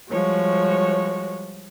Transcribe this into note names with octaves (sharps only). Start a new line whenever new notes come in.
F3 G3 G#3 F#4 C#5